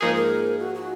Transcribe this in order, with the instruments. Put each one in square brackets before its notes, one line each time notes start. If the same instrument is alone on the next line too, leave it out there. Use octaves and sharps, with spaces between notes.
[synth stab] G#2 F3 A#3 D#4 G#4 [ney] A#4
[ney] A#4
F#4
F#4